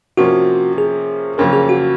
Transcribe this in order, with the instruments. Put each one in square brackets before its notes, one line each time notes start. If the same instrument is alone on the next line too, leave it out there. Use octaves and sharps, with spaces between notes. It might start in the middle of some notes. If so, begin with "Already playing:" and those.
[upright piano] C3 F3 A#3 C#4 [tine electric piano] F#4
[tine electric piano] G#4
[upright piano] F2 C#3 F#3 A#3 [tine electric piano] A#4
[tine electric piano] G#4
F#4